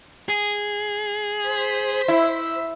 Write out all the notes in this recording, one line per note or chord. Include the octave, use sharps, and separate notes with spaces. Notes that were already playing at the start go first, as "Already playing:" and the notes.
G#4
C5 B6
E4